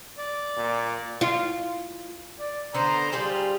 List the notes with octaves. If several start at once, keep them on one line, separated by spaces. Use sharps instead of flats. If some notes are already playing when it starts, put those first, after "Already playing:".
D5
A#2
F4
D5
D3 B3 C5 A#5
G3 F4 G4 G#4